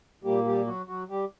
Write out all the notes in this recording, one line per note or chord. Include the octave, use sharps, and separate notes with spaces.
A#2 G3 A#3 G4
G3 G4
F#3 F#4
F#3 F#4
G3 G4